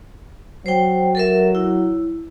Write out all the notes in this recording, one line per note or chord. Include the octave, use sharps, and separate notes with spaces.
F#3 C5 G5
A4 A#4 E5
E4